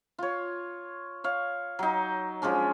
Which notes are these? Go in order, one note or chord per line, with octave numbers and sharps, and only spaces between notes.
F4 C#5
C#5 F5
F#3 D#4
F3 G#3 C#4 D4